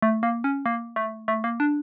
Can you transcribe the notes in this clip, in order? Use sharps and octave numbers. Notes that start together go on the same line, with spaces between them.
A3
A#3
C#4
A#3
A3
A3
A#3
D4